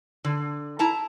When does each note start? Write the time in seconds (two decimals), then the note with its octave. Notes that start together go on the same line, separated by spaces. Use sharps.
0.24 D3
0.79 E4 A5 A#5